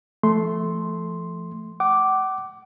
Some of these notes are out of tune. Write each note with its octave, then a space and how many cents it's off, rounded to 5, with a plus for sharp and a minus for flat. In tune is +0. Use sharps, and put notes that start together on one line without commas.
F3 -30 A3 -10 C6 +0
F#5 +40 D6 +0